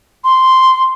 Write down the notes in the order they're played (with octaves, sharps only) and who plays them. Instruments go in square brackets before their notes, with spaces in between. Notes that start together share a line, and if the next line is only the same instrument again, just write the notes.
[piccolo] C6